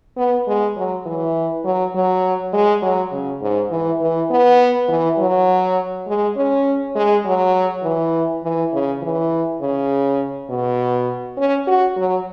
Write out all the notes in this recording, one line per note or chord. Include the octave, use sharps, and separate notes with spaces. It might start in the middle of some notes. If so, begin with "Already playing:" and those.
B3
G#3
F#3
E3
F#3
F#3
G#3
F#3
C#3
G#2
E3
E3
B3
E3
F#3
G#3
C#4
G#3
F#3
E3
E3
C#3
E3
C#3
B2
C#4
F#4
F#3